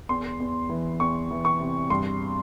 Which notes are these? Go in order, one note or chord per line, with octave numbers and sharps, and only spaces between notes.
E2 C6
E2
E3
E2 C#6
E3
C#6
C3
G2 C6